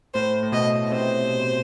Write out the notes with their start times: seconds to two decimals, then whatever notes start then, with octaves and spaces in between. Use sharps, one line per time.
0.14 A2 C5
0.43 A2
0.52 B2 D#5
0.84 B2
0.91 C3 C5